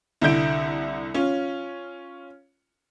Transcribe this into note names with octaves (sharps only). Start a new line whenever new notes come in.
C2 D3 E4 G6 D7
C#4 F4